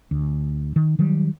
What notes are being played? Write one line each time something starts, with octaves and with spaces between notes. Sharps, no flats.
D2
D#3
D#3 F#3 G3